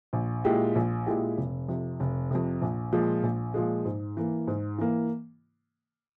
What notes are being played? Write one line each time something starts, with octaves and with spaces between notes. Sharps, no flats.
A#1
A#2 G#3 E4 G4
A#1
A#2 G#3 E4 G4
F1
F2 C3
F1
F2 C3
A#1
A#2 F3 G#3
A#1
A#2 F3 G#3
G#2
E3 A#3
G#2
E3 A#3